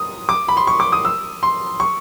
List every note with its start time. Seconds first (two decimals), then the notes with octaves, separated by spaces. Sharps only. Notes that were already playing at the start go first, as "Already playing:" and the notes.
Already playing: D#6
0.29 D6
0.48 B5
0.57 C6
0.67 C#6
0.80 D6
0.92 D#6
1.05 E6
1.43 C6
1.80 C#6